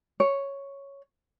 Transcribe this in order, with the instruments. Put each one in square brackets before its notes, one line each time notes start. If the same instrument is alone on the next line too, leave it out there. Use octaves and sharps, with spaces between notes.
[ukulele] C#5